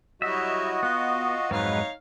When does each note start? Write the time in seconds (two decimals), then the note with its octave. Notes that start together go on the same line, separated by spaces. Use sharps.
0.22 F#3 G3 E4 F#4 D#5 E5
0.83 B3 F4
1.51 F2 G#2 F#3 G#3 D#4 B4 C#5 F5